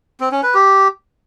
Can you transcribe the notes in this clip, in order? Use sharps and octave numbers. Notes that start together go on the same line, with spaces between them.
C4
C#4
B4
G4